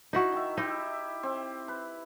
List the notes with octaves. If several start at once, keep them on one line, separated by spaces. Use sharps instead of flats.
D#4 E4 F#4
D#3 E5
D#4 E4 G4
C4
B4